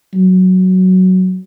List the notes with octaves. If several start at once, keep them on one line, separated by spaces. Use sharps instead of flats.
F#3